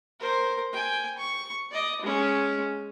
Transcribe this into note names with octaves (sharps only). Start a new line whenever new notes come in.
A#4 C5
G5 G#5
C#6
D5 D#5
G#3 C#4